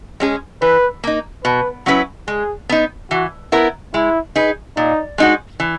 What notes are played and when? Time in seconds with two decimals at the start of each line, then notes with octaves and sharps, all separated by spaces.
0.20 G#3 C#4 G#4
0.62 E3 B4
1.04 A#3 D#4
1.44 B2 B4
1.86 F#3 C#4 E4 B4
2.28 G#3 G#4
2.69 B3 D#4
3.11 E3 F#4
3.52 B3 E4 A#4
3.94 G#3 E4
4.36 D#4 G#4 B4
4.77 A#2 D#4
5.18 G#3 D#4 F#4
5.60 E3